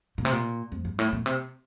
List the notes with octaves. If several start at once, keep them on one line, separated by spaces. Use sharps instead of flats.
A#2
C3
A#2
F2
G2
A2
A#2
C3